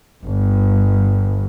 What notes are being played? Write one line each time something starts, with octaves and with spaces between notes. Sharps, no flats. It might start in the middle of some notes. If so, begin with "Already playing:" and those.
G1